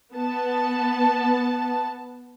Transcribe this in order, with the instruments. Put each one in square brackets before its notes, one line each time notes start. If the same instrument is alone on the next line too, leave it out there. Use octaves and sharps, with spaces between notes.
[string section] B3 A5